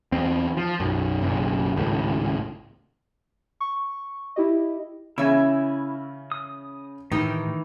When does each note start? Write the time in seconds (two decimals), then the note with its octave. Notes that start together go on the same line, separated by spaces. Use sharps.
0.12 E2 C4
0.57 F3
0.80 B1 F#2
1.22 F#1 B1
1.76 G#1 C#2 A2
3.61 C#6
4.36 E4 G4 D#5
5.18 C#3 E3 C#4 E4 E5 G#5
6.32 D#6
7.12 A2 D#3 E3 D#4 G4 A#4